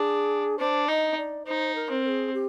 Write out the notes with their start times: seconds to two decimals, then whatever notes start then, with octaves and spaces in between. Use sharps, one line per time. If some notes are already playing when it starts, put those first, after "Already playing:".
Already playing: D4 G#4
0.59 D4 C5
0.88 D#4 D#5
1.17 D5
1.46 D#4 C5
1.75 A#4
1.90 C4
2.05 A#4
2.08 G#4
2.34 G4